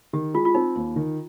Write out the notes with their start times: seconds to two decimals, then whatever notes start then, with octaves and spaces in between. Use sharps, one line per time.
0.13 D#3 G4
0.34 G#3 F4
0.45 F4
0.55 C4 D#4
0.75 D#2
0.96 D#3